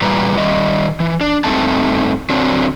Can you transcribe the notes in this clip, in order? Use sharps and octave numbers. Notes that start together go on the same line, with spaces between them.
A#2 E3 G3 B4 A#5
D#3 G3 D#5
E3
D4
G2 A3 C4 D#4 A5
D3 F#3 C4 D4